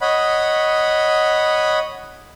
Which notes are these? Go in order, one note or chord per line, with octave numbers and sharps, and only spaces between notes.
C#5 D#5 F#5 B5